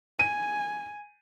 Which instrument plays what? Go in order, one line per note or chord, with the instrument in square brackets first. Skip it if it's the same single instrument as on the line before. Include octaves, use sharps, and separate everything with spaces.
[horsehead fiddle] G#5 [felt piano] D#7